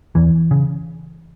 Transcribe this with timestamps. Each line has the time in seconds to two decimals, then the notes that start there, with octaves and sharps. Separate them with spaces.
0.15 E2 E3
0.51 C#3